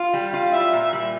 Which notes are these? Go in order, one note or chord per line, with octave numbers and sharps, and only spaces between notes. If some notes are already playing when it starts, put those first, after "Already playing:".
Already playing: F4
G3
F4
E4 E5
A#2
G3